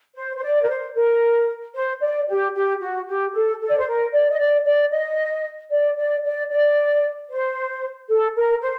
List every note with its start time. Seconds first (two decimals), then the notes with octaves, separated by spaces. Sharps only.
0.16 C5
0.36 C5
0.42 D5
0.61 A#4
0.69 C5
0.95 A#4
1.74 C5
2.01 D5
2.28 G4
2.54 G4
2.80 F#4
3.06 G4
3.33 A4
3.60 A4
3.69 D5
3.77 C5
3.86 A#4
4.13 D5
4.30 D#5
4.39 D5
4.65 D5
4.92 D#5
5.71 D5
5.97 D5
6.24 D5
6.51 D5
7.30 C5
8.08 A4
8.35 A#4
8.61 C5